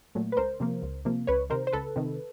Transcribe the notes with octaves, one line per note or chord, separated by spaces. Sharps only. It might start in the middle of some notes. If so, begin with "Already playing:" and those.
A#2 F#3 A3
B4
C#2 A#4 C5
C3 F3 A#3
C#2
C3 F3 A#3
C#2 B4 C#5
C3 D#3 A#4 C5
C5
C#2 A4 B4
C3 D#3